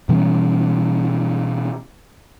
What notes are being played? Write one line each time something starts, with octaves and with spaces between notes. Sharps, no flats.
B2 E3 G3 C#4